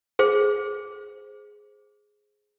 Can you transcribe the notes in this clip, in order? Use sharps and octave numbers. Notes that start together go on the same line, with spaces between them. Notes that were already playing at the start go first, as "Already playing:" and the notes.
G#4 C5